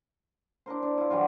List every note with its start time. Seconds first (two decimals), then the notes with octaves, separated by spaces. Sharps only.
0.66 D4 E4 A#4 C5
0.83 D4
0.98 E4 F4
1.10 E3 F#3 G3 F4